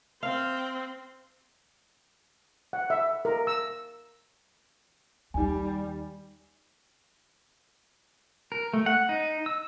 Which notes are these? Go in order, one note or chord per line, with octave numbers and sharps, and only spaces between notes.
C4 F5
F#5
E5
A#4
E6
D#2 G3 D#4 G#5
A#4
A3
F#5
D#4
E6